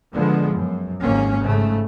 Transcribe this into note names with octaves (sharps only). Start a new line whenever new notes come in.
D3 F3 G#3 B3
F#2
G#1 D#2 G#2 A#3 C#4
G#2 C#3 A3